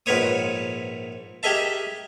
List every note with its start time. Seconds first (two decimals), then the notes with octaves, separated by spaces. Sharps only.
0.06 A#1 G#2 A#4 B4 C#5 D#6
1.43 G4 G#4 A#4 D#5 E5 A5